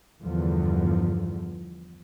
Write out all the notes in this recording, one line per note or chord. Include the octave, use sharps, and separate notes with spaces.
E2 G2 D3 F3